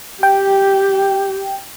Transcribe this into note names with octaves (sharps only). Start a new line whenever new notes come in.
G4 G5